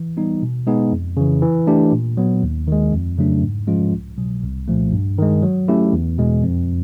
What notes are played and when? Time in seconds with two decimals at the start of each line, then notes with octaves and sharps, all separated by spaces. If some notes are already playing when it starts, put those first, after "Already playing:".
Already playing: E3
0.17 G3 B3 D#4
0.42 B2
0.67 G#3 B3 D#4 G#4
0.92 F2
1.17 C#3 E3
1.42 E3
1.67 A3 D4 G4
1.93 A#2
2.17 F#3 B3
2.43 D#2
2.67 D#3 G#3
2.92 F2
3.18 C#3 F#3 A3 D4
3.43 G#2
3.67 F3 G#3 C#4 F4
3.93 C2
4.18 B2 F#3
4.43 C2
4.68 A#2 F3 A3
4.92 G2
5.18 D#3 G#3
5.42 F#3
5.68 A3 C#4 E4 G4
5.93 E2
6.18 B2 G#3
6.43 F2